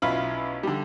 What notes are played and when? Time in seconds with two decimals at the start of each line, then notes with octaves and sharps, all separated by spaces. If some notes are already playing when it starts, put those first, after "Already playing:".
0.02 B1 C#4 E4 F4 F5 B5
0.63 D3 G3